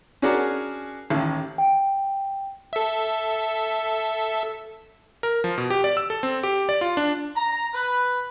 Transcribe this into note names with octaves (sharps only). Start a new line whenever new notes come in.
C#4 D4 F#4 G#4 A#4 D5
A1 D#2
G5
A4 E5
A#4
F3
B2
G4
D5
E6
A4
C4
G4
D5
F4
D4
A#5
B4